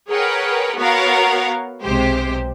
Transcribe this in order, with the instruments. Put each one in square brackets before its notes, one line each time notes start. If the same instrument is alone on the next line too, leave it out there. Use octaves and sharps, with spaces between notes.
[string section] G#4 A#4 B4 C#5 F#5 G5
B3 F#4 A#4 C#5 F5 F#5
B1 C3 G#3 G4 C5